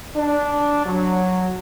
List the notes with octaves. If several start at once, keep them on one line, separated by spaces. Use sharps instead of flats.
D4
F#3